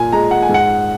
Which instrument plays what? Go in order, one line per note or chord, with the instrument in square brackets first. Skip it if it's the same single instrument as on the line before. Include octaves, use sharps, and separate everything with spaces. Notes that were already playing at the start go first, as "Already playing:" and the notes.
Already playing: [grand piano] A#2 G#5
G#3 A#5
F#5
G#5
G#2
F#5